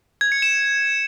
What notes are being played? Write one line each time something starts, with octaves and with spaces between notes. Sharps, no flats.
G#6
C#7
E7